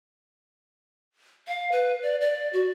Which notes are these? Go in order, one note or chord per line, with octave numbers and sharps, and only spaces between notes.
F5
B4
D5
D5
F#4